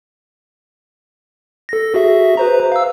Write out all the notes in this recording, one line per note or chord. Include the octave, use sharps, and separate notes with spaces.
A4 A#6
F#4 G#4 E5
B4 C5 A#5
F5 E6